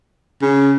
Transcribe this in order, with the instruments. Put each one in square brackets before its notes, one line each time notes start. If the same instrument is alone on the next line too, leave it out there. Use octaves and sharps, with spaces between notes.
[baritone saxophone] C#3